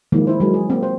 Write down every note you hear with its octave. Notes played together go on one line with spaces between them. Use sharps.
D#3 F3 G#3 A#3 E4
E4 C5
F#3 G#3 A#4
G#4
A#3 C4
C5